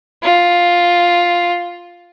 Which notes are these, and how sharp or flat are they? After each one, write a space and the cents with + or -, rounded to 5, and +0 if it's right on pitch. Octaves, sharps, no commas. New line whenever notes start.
F4 +5